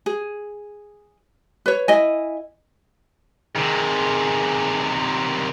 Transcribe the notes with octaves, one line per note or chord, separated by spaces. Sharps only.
G#4
B4 C#5
E4 D#5 G#5
C3 D#3 G#4